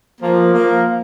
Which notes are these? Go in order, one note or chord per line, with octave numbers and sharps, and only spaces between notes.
F3 A#3
F3 A#3